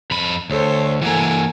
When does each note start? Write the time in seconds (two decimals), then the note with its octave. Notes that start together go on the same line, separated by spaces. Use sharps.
0.11 F2 B5
0.50 D2 A4 C5 C#5
1.02 E3 A#3 A4 F#5 G#5